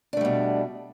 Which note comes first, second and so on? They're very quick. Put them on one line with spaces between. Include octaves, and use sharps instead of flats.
D4 A3 G3 B2